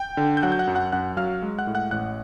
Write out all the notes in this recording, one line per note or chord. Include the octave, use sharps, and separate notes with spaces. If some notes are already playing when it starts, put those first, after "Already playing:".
Already playing: G5 G6
D3
G6
F#3 F#5 F#6
G6
F#5 F#6
F#2
F#5 F#6
F#2 F#5 F#6
F#3 F5 F6
G#3
F#5 F#6
A2
F#5 F#6
A1 F#5 F#6